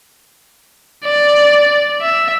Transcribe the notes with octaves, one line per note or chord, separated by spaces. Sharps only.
D5
E5